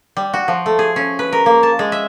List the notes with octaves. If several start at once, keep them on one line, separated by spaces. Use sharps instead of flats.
G3
F#4
F3
A3
G#4
C#4
B4
A#4
A#3
A5
G#3
E5